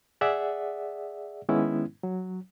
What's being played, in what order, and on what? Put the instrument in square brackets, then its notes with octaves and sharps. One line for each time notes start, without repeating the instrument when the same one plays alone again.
[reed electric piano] G#4 D5 E5 F#5
D#3 G#3 B3 C#4 E4
F#3